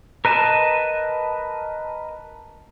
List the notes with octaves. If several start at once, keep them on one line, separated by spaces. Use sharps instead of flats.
A#4 B4 D#5 A5